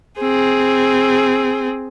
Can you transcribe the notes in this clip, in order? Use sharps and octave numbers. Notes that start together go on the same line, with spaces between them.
C4 G#4